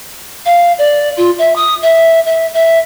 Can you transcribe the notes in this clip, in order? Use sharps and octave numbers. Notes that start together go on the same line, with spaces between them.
F5
D5
F4
E5
D#6
E5
E5
E5